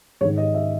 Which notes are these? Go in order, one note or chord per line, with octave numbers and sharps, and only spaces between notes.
G#2 D#3 C#5
D#5
E5